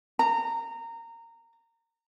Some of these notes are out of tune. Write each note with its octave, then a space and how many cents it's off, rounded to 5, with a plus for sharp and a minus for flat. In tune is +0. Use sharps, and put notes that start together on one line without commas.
A#5 -20